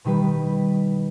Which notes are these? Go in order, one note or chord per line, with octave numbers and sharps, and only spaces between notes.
B2 D#3 G3 B4